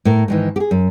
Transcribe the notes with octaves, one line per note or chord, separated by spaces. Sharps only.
A2 A#4
G#2 D#3 E3
G4 G#4
F#2